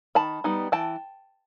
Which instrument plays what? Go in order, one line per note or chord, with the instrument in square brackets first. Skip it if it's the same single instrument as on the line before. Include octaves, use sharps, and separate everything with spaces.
[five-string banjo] D#3 A5 B5
G3 B3 D#4
E3 G5 A5